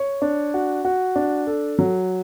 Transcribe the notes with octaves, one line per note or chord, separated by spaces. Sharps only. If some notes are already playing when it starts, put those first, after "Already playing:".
Already playing: C#5
D4
F#4
F#4
D4
A4
F#3